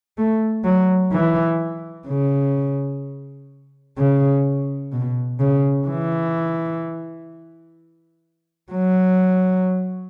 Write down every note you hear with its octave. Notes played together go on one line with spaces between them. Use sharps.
A3
F#3
E3
C#3
C#3
B2
C#3
E3
F#3